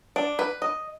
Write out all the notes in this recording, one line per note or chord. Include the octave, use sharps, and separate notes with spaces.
D4
B4
D#5